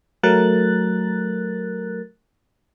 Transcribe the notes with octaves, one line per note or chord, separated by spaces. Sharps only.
F#3 A3 A#4 F#6 A6